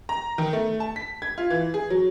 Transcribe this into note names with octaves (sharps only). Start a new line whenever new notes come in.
A#5
D#3
A3
A5
B6
G#6
F4
E3
G#4
F#3